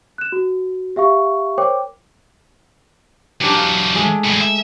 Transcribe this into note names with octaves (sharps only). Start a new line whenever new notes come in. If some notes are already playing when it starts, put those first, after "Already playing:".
F#6 E7
F#4
G4 E5 F5 C#6
A#4 C5 C#5 G5 D6
E3 F#3 D4 G4
F5
G#3 A3
E2 A2
E5